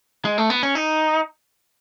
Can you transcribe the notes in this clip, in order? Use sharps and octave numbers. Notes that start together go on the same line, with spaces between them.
G#3
A3
B3
C#4
D#4